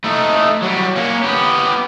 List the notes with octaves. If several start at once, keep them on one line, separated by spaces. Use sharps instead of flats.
A3 D#4
F#3 G3
A#3 C#4
B3 G4